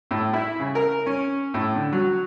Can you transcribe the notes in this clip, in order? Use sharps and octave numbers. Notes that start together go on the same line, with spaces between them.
A2
E4
C#3
A#4
C#4
A2
D3
F#3